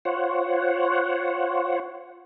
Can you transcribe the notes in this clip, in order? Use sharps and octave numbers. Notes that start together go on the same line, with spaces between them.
F4 C5 C#5 F#5